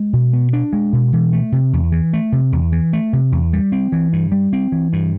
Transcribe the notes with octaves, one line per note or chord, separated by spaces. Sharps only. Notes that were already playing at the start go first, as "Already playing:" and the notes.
Already playing: G#3
B2
B3
D4
G#3
B2
E3
A3
C3
E2
E3
A3
C3
E2
E3
A3
C3
E2
G3
C4
E3
G2
G3
C4
E3
G2